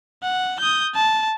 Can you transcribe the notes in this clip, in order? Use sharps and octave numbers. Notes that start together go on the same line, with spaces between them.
F#5
D#6 G6
A5